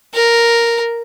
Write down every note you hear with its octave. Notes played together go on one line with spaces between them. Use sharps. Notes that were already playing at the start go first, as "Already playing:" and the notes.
A#4